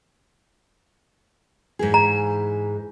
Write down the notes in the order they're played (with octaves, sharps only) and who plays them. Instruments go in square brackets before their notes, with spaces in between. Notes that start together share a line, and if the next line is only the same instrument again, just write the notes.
[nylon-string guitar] G#2 E3 G#4
[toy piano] A#5